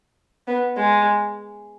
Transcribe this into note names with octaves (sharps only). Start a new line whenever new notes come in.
B3
G#3